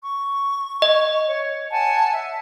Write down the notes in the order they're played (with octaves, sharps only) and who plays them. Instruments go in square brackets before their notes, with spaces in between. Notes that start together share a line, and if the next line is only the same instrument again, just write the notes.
[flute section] C#6
[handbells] D#5
[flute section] C#5
F#5 G#5 A5
E5